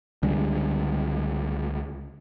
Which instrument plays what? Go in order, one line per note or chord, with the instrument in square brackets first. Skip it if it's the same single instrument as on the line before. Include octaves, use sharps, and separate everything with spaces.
[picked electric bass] C#2 D3 G3 G#3